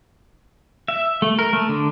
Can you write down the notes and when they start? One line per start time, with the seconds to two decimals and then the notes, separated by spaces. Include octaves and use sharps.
0.88 E5
1.22 A3
1.39 A#4
1.53 A3
1.69 D3